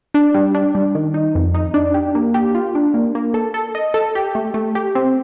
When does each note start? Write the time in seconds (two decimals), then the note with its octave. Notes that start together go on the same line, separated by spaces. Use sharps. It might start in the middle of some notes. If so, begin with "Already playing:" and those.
0.14 D4
0.34 G3
0.55 D4
0.75 G3
0.95 D#3
1.14 D#4
1.35 F2
1.54 D#4
1.74 D4
1.94 G4
2.15 A#3
2.34 G4
2.55 F4
2.75 D4
2.94 A#3
3.15 A#3
3.34 A4
3.54 A4
3.75 D#5
3.94 A4
4.15 G4
4.35 A3
4.54 A3
4.75 G4
4.95 C4